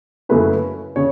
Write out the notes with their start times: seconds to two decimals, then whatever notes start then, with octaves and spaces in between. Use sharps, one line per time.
0.29 F#2 C#3 A3 C#4 E4 B4
0.96 C#3 C#5